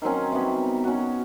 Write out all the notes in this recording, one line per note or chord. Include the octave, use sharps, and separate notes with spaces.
D#3 F#3 C4 C#4
C3 G3 B3
C#4 F#4